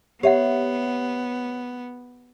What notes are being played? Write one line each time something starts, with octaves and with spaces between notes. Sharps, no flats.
B3 G4 C#5 E5 F#5